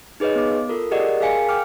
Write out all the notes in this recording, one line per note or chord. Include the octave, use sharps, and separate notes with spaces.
D#4 G#4 B4 C#5 D#5
B3 D6
F4 A4 A#4
G4 G#4 A#4 D5 D#5 F#5
G#4 A#4 F5 G#5 C#7
F5 G5 D6 F6